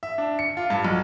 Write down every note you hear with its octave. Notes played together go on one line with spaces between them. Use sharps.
E5
D4
C#7
F4
G2
B1